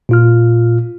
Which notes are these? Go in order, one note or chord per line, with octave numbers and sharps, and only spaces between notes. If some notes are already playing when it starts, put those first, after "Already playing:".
A#2 F4 F6